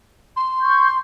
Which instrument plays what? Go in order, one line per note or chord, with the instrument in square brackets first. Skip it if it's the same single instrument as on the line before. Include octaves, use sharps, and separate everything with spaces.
[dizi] C6
[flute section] C#6 G6